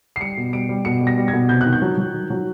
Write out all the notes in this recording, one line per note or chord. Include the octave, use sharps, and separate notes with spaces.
C7
G3 C#7
B2
G3 D7
G3
B2 C#7
G3
A#6
G3
G#6
B2
C3 G6
D#3 F#6
G6
F#3
F#3
D#3
F#3